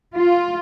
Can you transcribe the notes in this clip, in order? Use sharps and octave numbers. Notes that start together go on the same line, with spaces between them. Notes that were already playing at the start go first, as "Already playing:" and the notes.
F4